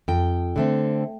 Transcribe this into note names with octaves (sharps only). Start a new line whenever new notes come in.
F2 G5
D3 A3 C4